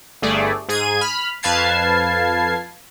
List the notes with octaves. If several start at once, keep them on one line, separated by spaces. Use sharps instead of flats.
G1 G2 A3 G#4 D5
G#2 G#4 G#6 D#7
B5 F6
F2 B4 F5 A5 G#6 C7